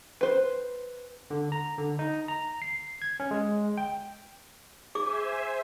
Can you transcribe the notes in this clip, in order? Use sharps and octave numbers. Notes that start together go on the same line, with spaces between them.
B4 C5
D3
A#5
D3
D#4
A#5
C7
G#6
C#4
G#3
G5
G#4 C5 E5 G#5 D6